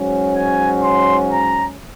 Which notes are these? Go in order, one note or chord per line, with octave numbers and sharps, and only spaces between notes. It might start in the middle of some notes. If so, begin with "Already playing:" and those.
Already playing: G#2 F#3 C#4
G#5
C6
A#5